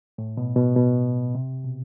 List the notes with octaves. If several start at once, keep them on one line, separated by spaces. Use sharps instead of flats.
A2
B2
B2
B2
C3
B2